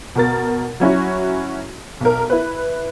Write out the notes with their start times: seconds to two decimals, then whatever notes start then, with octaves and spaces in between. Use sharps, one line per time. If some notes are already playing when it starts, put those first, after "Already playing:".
0.15 B2 A#4 A6
0.80 F#3 C#4 E4 F#4
2.01 B1 A#4
2.30 E4 B4